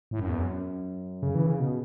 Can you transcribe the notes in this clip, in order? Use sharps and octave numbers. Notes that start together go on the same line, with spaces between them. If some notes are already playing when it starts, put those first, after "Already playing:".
A2
F#2
E2
F#2
C#3
E3
C#3
B2